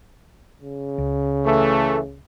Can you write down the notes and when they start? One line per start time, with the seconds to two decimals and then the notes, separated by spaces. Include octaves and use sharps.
0.62 C#3
0.98 C#2
1.45 E3 A3